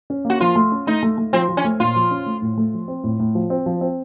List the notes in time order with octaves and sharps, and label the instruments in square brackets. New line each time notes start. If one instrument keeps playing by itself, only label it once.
[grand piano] C#4
A#3
[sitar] F#4
[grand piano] F3 [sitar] F4
[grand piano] A3
C#4
[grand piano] A3 [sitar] D#4
[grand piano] A3
A3
[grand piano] F3 [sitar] C4
[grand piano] F3
[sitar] C#4
[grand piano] A3
[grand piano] A#2 [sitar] F4
[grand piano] F3
C#4
A3
A2
A3
F3
C4
A2
A2
F3
C4
F3
C4